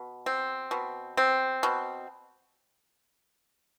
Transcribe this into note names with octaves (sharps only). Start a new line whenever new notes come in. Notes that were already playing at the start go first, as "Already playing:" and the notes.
Already playing: B2
C4
B2
C4
B2